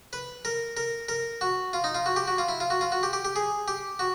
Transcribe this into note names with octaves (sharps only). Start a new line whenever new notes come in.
B4
A#4
A#4
A#4
F#4
F4
D#4
F4
F#4
G4
F#4
F4
E4
F4
F#4
F4
F#4
G4
G4
G4
G#4
G4
F#4